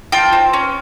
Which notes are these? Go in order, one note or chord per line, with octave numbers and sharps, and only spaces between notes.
F4 G5 A5
C4
C#4